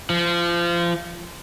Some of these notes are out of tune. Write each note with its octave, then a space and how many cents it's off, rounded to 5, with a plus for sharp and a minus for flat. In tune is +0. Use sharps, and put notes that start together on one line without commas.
F3 -25